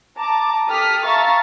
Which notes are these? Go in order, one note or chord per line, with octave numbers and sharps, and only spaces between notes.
A5 A#5 D6
G4 A4 D#6 F6 B6
E5 F5 A5 A#5 C#6 A6